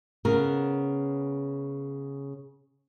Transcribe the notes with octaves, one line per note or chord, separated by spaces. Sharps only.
C#3 B3 A#4